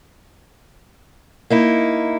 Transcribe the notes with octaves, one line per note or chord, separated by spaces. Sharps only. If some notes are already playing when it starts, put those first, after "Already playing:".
A#3 D#4 E4